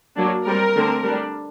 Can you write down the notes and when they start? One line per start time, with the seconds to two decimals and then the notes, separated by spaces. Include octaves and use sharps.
0.16 F#3 A#3 D4
0.46 G3 C4 A#4
0.75 D3 A3 C4
1.05 G3 D4